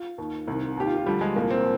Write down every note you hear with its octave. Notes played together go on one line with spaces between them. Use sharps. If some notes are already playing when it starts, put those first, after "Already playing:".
Already playing: F4
D#2 D#3
C2 C3 D#3
D#2 D#3 G4
F4
F4
D2 D3 F3 G3
G#3
C2 A#2 F3 A#3
C4